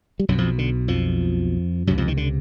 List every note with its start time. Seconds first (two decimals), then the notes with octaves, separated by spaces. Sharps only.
0.20 G3
0.28 B1 F#2 B2 F#3
0.38 F2 F3
0.58 D3
0.88 F2 F3
1.87 C#2 F#2 C3 F#3
1.98 F2 F3
2.08 D#3
2.17 D3